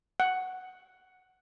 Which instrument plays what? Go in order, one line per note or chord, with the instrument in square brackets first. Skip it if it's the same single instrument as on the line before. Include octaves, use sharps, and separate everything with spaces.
[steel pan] F#5